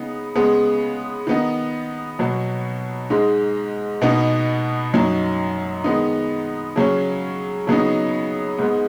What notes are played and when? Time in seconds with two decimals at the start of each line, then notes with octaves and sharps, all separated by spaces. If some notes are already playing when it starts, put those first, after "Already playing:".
Already playing: C#3 B3 D#4
0.35 C#3 G#3 B3
1.27 D#3 B3 D#4
2.19 B2 F#3 B3
3.10 G#2 G#3 D#4
4.02 B2 B3 D#4
4.94 F#2 F#3 D#4
5.84 D#3 G#3 B3 D#4
6.76 C#3 F#3 C#4
7.67 C#3 F#3 B3 D#4
8.59 G#2 G#3 B3